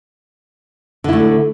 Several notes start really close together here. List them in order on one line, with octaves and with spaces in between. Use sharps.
D3 E4 A3